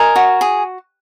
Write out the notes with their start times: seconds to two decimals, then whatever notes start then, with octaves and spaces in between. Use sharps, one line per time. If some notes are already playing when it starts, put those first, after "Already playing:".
Already playing: A#4 D#5 G#5
0.16 F#4
0.41 G#4